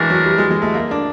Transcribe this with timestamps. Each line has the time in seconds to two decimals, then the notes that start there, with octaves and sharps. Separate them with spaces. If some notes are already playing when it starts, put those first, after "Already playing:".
Already playing: E3 G#3 A3 D4 F#4 A#4
0.10 F#3
0.26 G3
0.38 G#3
0.50 G#3
0.62 A3
0.74 A#3
0.91 D4